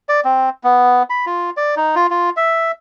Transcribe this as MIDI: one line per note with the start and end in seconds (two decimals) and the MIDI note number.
0.09 0.20 74
0.25 0.50 60
0.64 1.03 59
1.10 1.25 83
1.26 1.50 65
1.57 1.75 74
1.77 1.95 63
1.95 2.07 65
2.11 2.30 65
2.37 2.71 76